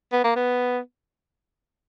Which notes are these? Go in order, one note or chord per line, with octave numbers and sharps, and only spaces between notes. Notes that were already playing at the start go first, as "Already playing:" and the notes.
B3
A#3
B3